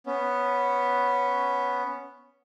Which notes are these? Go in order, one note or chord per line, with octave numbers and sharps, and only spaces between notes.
B3 C#4